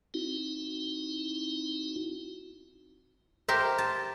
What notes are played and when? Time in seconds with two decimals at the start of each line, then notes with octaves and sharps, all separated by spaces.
0.14 C4 D#4 E4 F#4
3.48 G4 A#4 C5 E5
3.78 A5